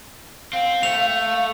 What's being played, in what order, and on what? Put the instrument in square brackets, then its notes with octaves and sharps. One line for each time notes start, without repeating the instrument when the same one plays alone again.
[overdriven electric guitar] C4 [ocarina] F5
[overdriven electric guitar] A3 [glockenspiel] F7